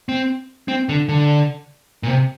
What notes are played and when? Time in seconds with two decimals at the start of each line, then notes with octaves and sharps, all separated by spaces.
0.09 C4
0.68 C4
0.89 D3
1.09 D3
2.03 A#2
2.08 C3